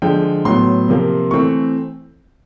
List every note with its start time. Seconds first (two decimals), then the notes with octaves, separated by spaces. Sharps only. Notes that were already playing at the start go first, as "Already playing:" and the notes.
0.02 D3 F3 G#3 G5
0.45 A2 F#3 B3 C6
0.88 C3 F3 A#3
1.31 E3 A3 C4 C#6